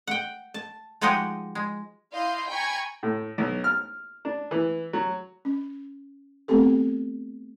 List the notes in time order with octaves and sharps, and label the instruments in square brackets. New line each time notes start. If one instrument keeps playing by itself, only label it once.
[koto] F#5 G5
A5
F3 G#3 D#4 F#4 G4 D#5
G#3
[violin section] E4 D#5 F5 C6 G6
G5 G#5 A#5 B5 C#6 G#6
[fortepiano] A2
B1
F6
D4
E3
F#3
[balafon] C#4
A3 B3 C4 G4 A4